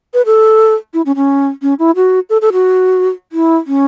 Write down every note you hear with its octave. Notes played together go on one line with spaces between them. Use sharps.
B4
A4
E4
C#4
C#4
C#4
E4
F#4
A4
A4
F#4
E4
C#4